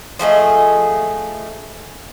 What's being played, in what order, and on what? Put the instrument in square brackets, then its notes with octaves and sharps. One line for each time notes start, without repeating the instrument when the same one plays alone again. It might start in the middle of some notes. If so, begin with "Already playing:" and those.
[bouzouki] F3 A3 G#4 D#5